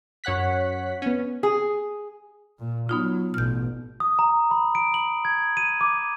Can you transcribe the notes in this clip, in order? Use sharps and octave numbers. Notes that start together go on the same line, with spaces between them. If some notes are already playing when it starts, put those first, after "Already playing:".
F#2 C#5 F#5 F#6 B6
B3 C#4
G#4
A#2
F#3 B3 D#4 F4
A1 B2 F6 G6
D#6
A#5
B5
D7
F#7
G#6
D#7
D6